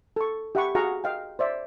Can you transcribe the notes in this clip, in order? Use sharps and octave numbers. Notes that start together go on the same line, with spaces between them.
A4 C#6
G4 E5 F#5 A5 B5 C#6
F#4 G#4 F5 F#5 A#5 C#6
D#5 F5 G5
C5 D5 E5